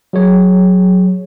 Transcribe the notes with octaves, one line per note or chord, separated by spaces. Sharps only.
F#3 G#4 C#5